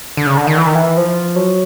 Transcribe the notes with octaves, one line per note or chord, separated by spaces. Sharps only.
D3
C#3
D3
D#3
E3
D#3
E3
F3
F#3